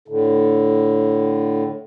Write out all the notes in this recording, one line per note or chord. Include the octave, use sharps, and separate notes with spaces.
A2 D3